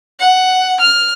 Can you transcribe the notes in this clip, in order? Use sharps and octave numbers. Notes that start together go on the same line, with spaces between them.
F#5
F6